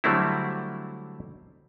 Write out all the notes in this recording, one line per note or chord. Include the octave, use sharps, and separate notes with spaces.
D3 F#3 G3 A3 C4 E4